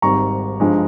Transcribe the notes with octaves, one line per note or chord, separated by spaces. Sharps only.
G#1 G#2 G3 A#5 C#6
G2 F3 G#3